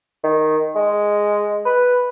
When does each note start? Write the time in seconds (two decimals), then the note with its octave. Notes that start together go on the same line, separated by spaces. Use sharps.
0.24 D#3
0.76 G#3
1.66 B4